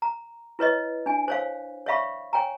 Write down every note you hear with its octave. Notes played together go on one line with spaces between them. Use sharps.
A#5
E4 B4 C#5 D#5
D4 G#5
C5 C#5 F5
C#5 D5 E5 F5 B5 C#6
C#5 G5 G#5 A#5